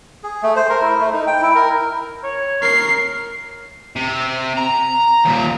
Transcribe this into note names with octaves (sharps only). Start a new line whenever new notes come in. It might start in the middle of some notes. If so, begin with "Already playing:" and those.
G#4
A3
C5
A#4
E4
A3
D#4
G5
E4
A#4
C#5
A#4 C7
C3
A#5
D#2 A#2